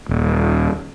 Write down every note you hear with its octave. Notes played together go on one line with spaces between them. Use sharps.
D#1